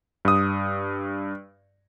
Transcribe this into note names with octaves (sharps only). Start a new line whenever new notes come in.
G2 D#6